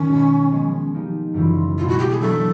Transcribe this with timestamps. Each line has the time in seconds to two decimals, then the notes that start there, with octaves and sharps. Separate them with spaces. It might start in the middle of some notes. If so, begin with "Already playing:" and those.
Already playing: D#3 C#4
0.08 B2 G#3 C4
0.51 F3 G#3 B3
0.93 F3 A#3 D#4 G4
1.34 F#2 C#3 E3 G3 F4
1.78 B2 G#3 C4 E4 F4
1.88 F#4
1.98 G4
2.10 G#4
2.20 F#3 A#3 D4 A4